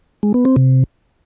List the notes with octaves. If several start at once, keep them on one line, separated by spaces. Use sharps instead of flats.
G#3
B3
C4
C3